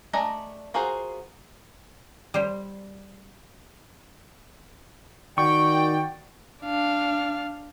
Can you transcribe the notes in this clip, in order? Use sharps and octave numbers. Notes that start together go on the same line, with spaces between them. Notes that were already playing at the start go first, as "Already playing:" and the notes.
A3 D4 D#5 G#5 A#5
F4 F#4 G#4 A#4 C5
G3 C5
D#3 F#4 D5 G5 C#6
D4 F5